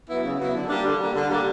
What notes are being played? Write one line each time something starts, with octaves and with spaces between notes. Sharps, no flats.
F#3 B3 E4
C#3
F#3 B3 E4
D3
G3 A#3 D4
D3
G3 A#3 D4
D3
G3 A#3 D4